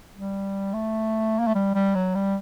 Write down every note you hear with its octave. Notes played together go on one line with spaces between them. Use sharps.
G3
A3
A#3
A3
G3
G3
F#3
G3